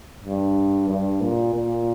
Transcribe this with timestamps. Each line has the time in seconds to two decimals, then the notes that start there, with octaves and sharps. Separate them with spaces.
0.24 G2
0.90 G2
1.22 A#2
1.54 A#2